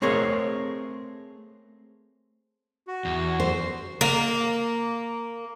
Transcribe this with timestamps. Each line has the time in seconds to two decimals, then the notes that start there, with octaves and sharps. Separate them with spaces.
0.02 A3 C4 G#4 A#4 C#5
2.88 F#4
3.05 E2
3.40 C5
4.01 A#3